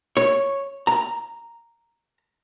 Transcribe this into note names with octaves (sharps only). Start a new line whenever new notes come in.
C#5
A#5